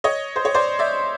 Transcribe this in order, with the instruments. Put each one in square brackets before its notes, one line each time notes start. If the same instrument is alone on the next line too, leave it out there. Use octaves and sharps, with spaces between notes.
[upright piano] C#5 D#5
C5
C#5
C5 D5
D5 E5